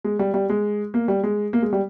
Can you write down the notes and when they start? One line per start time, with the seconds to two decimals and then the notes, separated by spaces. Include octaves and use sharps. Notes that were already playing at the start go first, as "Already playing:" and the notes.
0.04 G#3
0.19 G3
0.34 G3
0.49 G#3
0.94 A#3
1.08 G3
1.23 G#3
1.53 A#3
1.62 G#3
1.73 G3